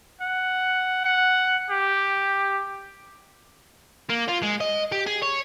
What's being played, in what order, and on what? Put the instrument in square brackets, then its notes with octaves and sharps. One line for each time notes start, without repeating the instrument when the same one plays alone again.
[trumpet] F#5
F#5
G4
[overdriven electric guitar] A#3
F4
G#3
D#5
G4
G#4
C#5